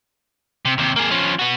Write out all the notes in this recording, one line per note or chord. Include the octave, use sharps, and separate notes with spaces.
C3
D#2 C3
A#3 G#4
F3 C#4
B3 F#4